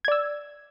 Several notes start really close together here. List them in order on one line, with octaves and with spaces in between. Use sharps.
G#6 D5 E6